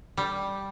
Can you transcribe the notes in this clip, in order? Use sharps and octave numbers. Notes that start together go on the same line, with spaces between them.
G3